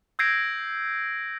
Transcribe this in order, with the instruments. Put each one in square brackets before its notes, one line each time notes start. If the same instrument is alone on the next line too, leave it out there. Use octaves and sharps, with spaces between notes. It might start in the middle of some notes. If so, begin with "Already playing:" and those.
[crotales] E6 G6 G#6 A#6 C7 D7